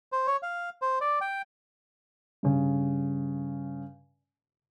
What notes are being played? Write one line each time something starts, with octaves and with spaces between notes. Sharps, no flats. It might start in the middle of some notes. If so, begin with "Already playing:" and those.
C5
C#5
F5
C5
D5
G5
G2 C#3